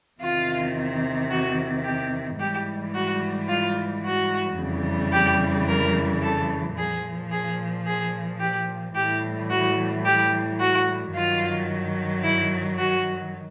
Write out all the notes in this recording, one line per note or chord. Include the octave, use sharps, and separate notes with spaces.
E2 C3 D#3 F4
F#4
G4
G#2 E3 G3 G4
F#4
F4
F#4
F2 C#3 E3 G3
G4
A#4
A4
A#2 F3 G#4
G#4
G#4
G4
A2 E3 G3 G4
F#4
G4
F#4
G2 D#3 F#3 F4
E4
F#4